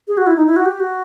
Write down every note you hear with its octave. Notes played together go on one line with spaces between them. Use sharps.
G#4
F#4
E4
D#4
E4
F#4
G4
F#4